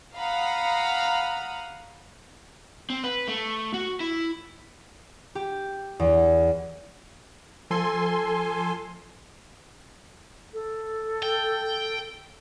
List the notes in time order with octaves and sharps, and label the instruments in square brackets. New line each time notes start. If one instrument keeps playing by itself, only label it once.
[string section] F5 F#5 A#5 B5 D#6 F6
[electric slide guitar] C4
B4
A3
F#4
E4
[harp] G4
E2
[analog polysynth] F3 A4 G#5 C6
[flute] A4
[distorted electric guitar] G5